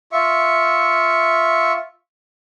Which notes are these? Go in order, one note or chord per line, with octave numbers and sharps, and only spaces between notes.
F4 E5 C#6